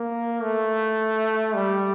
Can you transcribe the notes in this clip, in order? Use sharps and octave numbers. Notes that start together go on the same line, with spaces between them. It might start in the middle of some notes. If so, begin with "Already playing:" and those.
Already playing: A#3
A3
G3